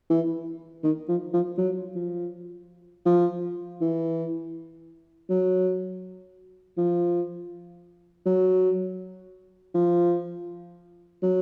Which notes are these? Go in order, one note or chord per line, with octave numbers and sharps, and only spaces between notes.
E3
D#3
F3
F3
F#3
F3
F3
E3
F#3
F3
F#3
F3
F#3